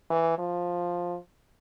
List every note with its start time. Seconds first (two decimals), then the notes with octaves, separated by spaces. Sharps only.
0.10 E3
0.39 F3